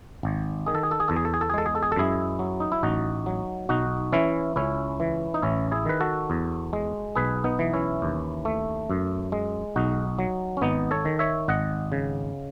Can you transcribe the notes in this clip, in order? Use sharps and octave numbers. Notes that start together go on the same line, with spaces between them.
G#1
D#3 G#4
A4
G#4
A4
G#4
E2 A4
G#4
A4
G#4
A4
G#4
G#3 A4
G#4
A4
G#4
A4
F#2 E4 G#4
F#3
D#4
E4
A1 D#4 F#4
F#3
B1 D#4 F#4
E3 C#4 E4
C#2 C#4 E4
E3
D#4
A1 C#4 E4
E4 G#4
D#3 B4
F#4 A4
E2
G#3
B1 G#4 B4
B3 D#4
E3
C#4 E4
D#2
A3
F#2
G#3
B1 D#4 F#4
F#3
C#4
G#1 B3 D#4
A4 C#5
D#3
C#5 E5
G#1 D#5 F#5
C#3